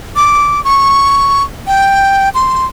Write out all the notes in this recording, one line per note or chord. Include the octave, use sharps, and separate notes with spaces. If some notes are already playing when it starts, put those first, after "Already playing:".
D6
C#6
G5
C6